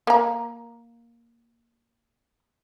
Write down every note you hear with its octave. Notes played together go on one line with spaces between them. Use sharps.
A#3 A#5